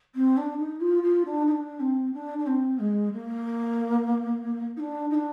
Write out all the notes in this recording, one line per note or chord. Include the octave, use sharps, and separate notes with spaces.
C4
D4
D#4
F4
F4
D4
D#4
D4
C4
D4
D4
C4
G#3
A#3
D#4
D4
D#4
D4